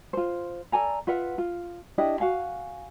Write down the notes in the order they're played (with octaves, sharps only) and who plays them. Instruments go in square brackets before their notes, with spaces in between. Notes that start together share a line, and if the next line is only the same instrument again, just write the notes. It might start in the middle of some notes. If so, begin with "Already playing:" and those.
[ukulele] F4 C5
A4 D5 G#5 A#5
F4 B4 E5 F#5
F4
D4 E4 G4 D#5
F#4 F5 G#5